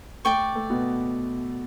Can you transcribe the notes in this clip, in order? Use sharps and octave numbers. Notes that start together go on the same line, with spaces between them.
A3 D5 G5 C#6
A3
B2 B3